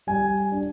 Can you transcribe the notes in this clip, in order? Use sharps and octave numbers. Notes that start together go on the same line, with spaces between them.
G3 G#5
D4